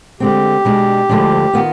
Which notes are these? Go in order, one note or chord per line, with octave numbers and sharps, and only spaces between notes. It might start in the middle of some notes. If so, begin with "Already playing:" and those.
D3 G#3 C4 G4
B2 G#3 D4
D2 D3 F3 G#3 D4
D#3 B3 F4